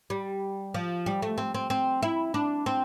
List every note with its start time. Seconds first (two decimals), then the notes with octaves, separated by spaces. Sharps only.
0.10 G3
0.74 F3
1.06 G3
1.22 A3
1.38 C4
1.54 C4
1.70 C4
2.02 E4
2.34 D4
2.66 C4